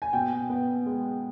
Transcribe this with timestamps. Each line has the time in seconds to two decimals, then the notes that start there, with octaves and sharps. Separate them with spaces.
0.02 G#5
0.13 B2 G5
0.49 B3
0.86 G#3